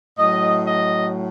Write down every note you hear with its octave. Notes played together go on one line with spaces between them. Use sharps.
A2 F#3 D#5
D#5